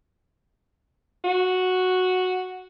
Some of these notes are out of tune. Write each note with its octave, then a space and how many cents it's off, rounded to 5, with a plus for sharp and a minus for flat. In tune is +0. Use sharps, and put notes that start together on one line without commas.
F#4 -5